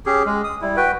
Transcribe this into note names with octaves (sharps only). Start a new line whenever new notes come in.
C#4 G4 G#4
G#3
D#6
G3 E4
F#4 B4 G5